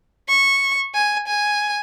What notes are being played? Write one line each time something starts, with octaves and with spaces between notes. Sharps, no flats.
C#6
G#5
G#5